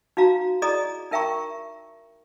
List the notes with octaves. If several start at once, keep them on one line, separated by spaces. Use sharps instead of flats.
D#4 F#4 F5 A#5
E4 G#4 D5 D#5 A#5 D#6
D#4 A#4 E5 G5 A#5 C#6